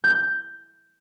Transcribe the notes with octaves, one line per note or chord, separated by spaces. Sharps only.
G6